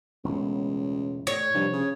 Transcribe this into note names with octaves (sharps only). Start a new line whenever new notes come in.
E1 C#2 A2
A2 C#5
G2 C3 F3
C#3